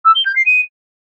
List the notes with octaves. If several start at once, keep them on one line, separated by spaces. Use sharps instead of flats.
E6
G7
G6
C7
D#7